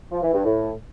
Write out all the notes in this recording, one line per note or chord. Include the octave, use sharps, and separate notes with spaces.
F3
E3
G2
A2